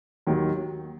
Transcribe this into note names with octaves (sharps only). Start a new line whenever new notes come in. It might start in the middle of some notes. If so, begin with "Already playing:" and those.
D#2 D#3 F#3